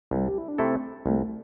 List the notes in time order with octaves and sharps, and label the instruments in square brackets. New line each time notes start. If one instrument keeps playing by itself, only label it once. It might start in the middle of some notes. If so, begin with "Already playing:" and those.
[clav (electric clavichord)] C2 [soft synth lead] G3
[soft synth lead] G4
E4
D4
[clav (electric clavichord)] C3 A3 E4 A4 [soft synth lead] C4
[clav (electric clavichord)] C2 [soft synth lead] A3